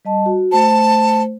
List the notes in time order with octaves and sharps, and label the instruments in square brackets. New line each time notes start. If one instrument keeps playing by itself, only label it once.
[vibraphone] G3 D#5 A5
F#4
[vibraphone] A3 C5 [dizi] A5